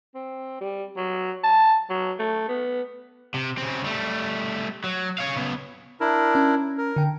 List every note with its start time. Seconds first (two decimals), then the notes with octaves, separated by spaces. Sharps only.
0.14 C4
0.60 G3
0.97 F#3
1.44 A5
1.90 F#3
2.19 A3
2.48 B3
3.34 C3
3.58 C#3 C4
3.84 G3 A3
4.84 F#3
5.18 C#5 F5
5.36 C#3 B3
6.00 D4 E4 A#4
6.35 C#4
6.78 A#4
6.96 D3 G5